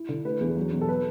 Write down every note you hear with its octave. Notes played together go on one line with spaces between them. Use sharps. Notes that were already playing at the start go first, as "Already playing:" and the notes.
Already playing: E4
D3
A3 B4
E2
F#3
B2
A4
B4